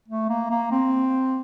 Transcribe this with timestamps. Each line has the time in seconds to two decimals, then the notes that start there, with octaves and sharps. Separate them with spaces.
0.08 A3
0.29 A#3
0.50 A#3
0.71 C4